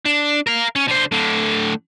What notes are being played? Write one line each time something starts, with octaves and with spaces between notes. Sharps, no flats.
D4
A#4 F5
C#4
D3 C5
A2 D3